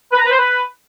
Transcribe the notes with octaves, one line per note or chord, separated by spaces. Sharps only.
B4
A#5
B4
C5
B4